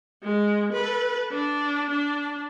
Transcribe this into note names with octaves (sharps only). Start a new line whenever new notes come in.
G#3
A4 B4
D4
D4